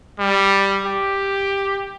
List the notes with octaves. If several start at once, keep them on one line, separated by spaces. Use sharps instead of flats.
G3
G4